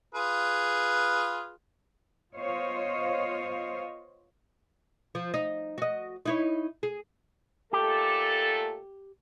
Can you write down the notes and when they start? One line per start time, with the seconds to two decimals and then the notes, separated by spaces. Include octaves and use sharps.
0.15 F4 G#4 B4
2.35 B3 F4 C5 C#5 D#5 F5
5.15 F3
5.34 D#4
5.78 F#4 D#5
6.26 D#4 E4 C#5
6.83 G#4
7.73 A#2 A3 G4 A4